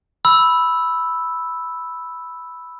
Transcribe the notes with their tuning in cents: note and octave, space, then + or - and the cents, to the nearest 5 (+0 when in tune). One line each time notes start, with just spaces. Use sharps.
B5 +0 E6 +0